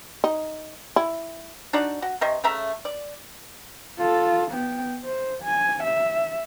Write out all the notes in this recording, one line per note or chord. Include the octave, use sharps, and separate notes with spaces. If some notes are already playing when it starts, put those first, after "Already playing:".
D#4
E4
D4 D#4 F#4 D5
F#4
C3 D#5 C#6
C#3 A3 E5 A#5
D5
F4 A4
B3 G5
C5
G#5
E5